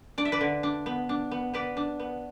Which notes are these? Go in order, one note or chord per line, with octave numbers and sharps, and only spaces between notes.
D4 D5
E5
B4 D5
D3
D4
B3
D4
B3
B3 B4 D5
D4
B3